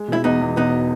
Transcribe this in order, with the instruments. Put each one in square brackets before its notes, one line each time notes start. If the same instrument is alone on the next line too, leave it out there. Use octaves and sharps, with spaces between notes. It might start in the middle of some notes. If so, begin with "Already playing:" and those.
Already playing: [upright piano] G#3
[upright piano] B2 [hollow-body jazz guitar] E4
[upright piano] E2 [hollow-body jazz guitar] B3 D#4
[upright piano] E2
[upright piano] E1 [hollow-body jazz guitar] B3 D#4